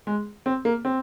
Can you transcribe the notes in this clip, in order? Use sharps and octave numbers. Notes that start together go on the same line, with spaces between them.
G#3
C4
A#3
C4